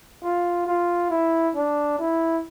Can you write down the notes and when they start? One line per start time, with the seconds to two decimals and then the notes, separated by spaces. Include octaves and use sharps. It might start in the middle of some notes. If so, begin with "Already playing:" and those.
0.22 F4
0.67 F4
1.10 E4
1.55 D4
1.99 E4